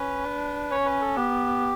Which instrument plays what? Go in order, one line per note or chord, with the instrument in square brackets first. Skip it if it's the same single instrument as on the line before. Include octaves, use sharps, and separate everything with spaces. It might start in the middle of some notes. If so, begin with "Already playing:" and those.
Already playing: [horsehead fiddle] C#4 [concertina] B4
[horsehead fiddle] D4
[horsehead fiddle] C#4 [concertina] C#5
[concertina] B4
A4
[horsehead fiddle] B3 [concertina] G4